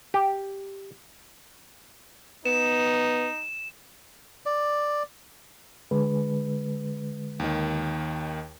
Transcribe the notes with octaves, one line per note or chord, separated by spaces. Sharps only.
G4
B3 D#4 E7
D5
D3 G#3 B4
D#2 D#3